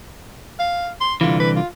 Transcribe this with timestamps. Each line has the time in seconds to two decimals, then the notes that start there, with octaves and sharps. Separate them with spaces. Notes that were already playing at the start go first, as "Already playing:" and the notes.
0.60 F5
1.00 C6
1.21 C2 D3 E3 F4
1.40 B4
1.56 F4